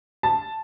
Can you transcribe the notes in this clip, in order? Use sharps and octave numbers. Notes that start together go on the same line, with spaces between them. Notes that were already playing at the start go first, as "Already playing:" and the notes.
A5